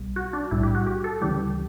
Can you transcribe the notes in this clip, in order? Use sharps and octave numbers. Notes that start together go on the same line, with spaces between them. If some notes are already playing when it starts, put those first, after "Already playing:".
Already playing: B1 B2 G3
F#4
D4
B1 A2 G3 E4
G4
F#4
G4
A4
D2 C#3 E3 G3 G4